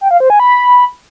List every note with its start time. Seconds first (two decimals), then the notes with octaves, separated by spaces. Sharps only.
0.01 G5
0.11 F5
0.20 C5
0.30 G#5
0.40 B5